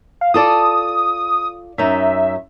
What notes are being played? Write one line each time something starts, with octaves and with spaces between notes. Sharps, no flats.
F5
F4 A4 D5 D#6
F#2 D#4 E5